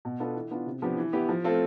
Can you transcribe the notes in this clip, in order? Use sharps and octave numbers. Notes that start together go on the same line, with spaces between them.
B2
B3 D4 F4 A4
E3
B3 D4 F4
C3
F3 B3 D4 G4
E3
B3 E4 G4
F3
A3 C4 F4 A4